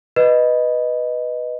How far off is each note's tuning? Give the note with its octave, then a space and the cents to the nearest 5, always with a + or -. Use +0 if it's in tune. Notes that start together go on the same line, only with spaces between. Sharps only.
B4 -5 D#5 -5